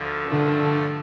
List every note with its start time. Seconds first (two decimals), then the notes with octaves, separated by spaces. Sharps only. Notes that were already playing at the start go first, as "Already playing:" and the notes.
Already playing: D2 D3 F3
0.28 G2 D3 F3 A3